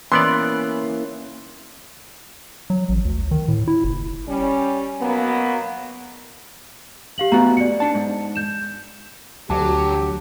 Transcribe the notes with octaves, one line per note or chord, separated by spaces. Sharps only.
E3 A#3 B3 C#4 E4 D5 C6
F#3
A1
D2
D#3
A2
E4
F#1
G3 C#4
B2 F#3 A#3 B3
G4 F5 F#7
A3 B3 F#4 A#5
D5 C#7
D4 A5
G#2
G6 E7
D2 F#3 G4 A5 D6